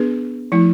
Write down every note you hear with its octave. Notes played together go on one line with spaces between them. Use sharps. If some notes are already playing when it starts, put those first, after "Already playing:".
Already playing: B3 D4 G#4 B4
F3 A3 E4